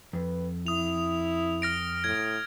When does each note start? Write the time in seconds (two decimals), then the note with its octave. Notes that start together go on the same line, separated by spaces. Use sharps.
0.13 F2 B4
0.67 E4 D#6 F7
1.62 F6 A#6 D7
2.04 A2 G#6